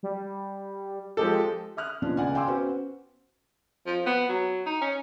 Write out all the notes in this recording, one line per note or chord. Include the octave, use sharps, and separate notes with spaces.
G3
F3 G#3 G4 A4
E5 D#6 F6 F#6
D#2 B2 F3 C#4 D4
C#2 D5 F#5 G#5
F5 G5 G#5 C6 D6 E6
B3 C#4 F#4 B4 C5
F3
B3
F#3
D#4
C#4